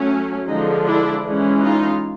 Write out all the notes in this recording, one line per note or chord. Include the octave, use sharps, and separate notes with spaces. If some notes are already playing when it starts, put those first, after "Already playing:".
Already playing: F#3 A3 C#4
D3 F3 G#3 D#4
D4 E4
E3 G#3 C#4
D#4 F4